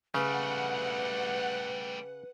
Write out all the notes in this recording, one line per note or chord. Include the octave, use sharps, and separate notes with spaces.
C#3 G3 A3 B4 F#5